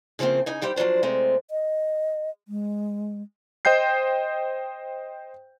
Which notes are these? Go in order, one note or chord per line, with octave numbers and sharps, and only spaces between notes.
C#3 F3 A3 A#3 C4
C#3 D#4 G#5
D#3 G3 G4 C5
F3 F#3 G#3 D4 C5
C3 G#3 A3 C4
D#5
G#3
C5 D#5 G5 G6 C7